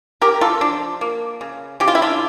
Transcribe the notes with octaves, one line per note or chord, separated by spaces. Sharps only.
C#3 G4 A#4
F4 A4
F3 D4
A#3
C#3
C#3 G4
F4
E4
D4 F4